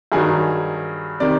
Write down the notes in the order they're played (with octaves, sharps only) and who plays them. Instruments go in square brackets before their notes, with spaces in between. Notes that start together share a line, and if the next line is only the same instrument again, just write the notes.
[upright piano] G2 D#3 F#3 G#4
C3 D#3 D5